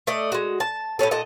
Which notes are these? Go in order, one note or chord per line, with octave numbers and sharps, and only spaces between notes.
A3 D5 D#5
G#3 F#4
A5
A2 C3 C#4 A4
A#2 A4 D#5 F#5